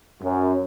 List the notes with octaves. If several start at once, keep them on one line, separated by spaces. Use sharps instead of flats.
F#2